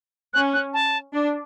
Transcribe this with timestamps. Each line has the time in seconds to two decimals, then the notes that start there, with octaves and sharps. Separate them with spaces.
0.34 C#4 F#6
0.54 F#6
0.74 A5
1.14 D4